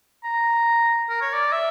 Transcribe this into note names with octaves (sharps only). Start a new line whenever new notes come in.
A#5
A#4
C#5
D5
E5